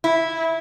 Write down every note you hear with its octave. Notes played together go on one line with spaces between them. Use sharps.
E4